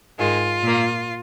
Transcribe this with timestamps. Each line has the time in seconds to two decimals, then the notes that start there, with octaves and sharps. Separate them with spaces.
0.19 G#2 D#3 G#3 F4
0.63 A#2 A#3